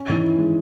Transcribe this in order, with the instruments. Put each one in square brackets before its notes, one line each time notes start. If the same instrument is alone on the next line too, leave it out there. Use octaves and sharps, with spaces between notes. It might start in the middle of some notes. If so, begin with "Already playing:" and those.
Already playing: [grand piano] C#4
[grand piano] D#3 [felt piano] E3
[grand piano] E4
G#3